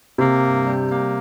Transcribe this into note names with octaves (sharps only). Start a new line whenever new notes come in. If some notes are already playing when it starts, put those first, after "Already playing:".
C3 A#3
G2
G3
A#3